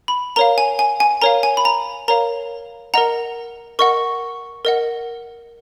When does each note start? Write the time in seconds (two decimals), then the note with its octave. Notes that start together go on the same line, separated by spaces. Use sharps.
0.08 B5
0.36 A#4 C#5 F5 A#5
0.58 G#5
0.79 G#5
1.00 G#5
1.22 A#4 C#5 F5 A#5
1.43 G#5
1.57 B5
1.65 A#5
2.08 A#4 C#5 F5 A#5
2.94 A#4 D#5 F#5 A#5
3.79 A#4 D#5 F#5 C#6
4.65 A#4 D#5 F#5